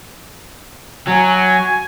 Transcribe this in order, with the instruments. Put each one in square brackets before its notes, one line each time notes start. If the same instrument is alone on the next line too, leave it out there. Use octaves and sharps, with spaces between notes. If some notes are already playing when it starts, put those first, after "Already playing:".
[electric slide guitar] F#3 [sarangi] G#5